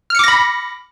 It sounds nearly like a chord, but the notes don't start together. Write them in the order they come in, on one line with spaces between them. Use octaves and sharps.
F6 C#7 D6 A#6 B5